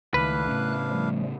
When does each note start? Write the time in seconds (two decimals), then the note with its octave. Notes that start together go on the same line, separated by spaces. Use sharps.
0.14 C#2 D#3 A3 D4 E4 B4 F5 F#6
0.48 A2 C#3
0.90 F3 G3 A3